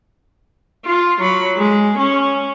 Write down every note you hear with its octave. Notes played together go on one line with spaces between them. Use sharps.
F4
F#3 B5
G#3
C#4